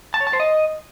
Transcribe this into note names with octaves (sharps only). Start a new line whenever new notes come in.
A5
C#5
A5
C5
D#5